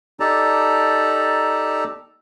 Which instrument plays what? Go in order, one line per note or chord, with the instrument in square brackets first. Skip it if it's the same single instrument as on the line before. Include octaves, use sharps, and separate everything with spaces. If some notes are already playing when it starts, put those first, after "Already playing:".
[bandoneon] D#4 G4 A4 D5 A5 A#5